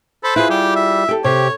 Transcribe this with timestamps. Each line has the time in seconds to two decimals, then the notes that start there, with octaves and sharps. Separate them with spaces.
0.24 A4 C5 B5
0.36 E4 F4 G#4 B4
0.50 G3 G4
0.76 E5
1.09 G4 A4
1.24 C3 G4 C#5